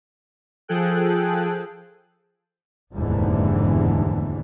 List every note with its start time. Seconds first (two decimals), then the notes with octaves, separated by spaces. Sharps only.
0.68 F3 G#4 A4 G5 F#6
2.94 F1 D#2 G#2 B2 D3 E3